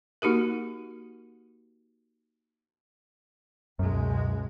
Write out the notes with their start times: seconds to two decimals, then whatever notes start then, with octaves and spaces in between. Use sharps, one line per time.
0.22 A#3 D#4 F#4 G4 A#4
3.79 C#2 F#2 B2 G#3